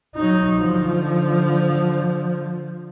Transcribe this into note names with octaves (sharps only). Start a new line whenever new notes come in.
F#3 D#4
D3 F3